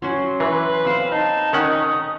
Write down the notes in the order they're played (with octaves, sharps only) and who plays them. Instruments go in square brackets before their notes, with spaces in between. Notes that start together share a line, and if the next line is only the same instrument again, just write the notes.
[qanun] F#3 C#4 F#4 [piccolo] C6
[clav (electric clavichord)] E3 [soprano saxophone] B4
[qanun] C4 C5 [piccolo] F5
[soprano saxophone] D#4 [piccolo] A5
[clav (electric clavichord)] D#3 C#4 F#5 [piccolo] D#6